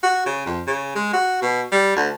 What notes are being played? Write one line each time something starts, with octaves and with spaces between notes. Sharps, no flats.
F#4
C#3
F2
C#3
G#3
F#4
B2
G3
D2